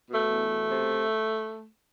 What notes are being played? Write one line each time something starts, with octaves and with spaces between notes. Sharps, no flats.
B2 A3
E2
B2
C3